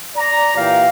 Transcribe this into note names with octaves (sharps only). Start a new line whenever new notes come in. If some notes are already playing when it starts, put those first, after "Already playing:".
D5 A#5
A#2 E3 G4 F5